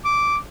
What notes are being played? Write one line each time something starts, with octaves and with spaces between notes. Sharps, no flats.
D6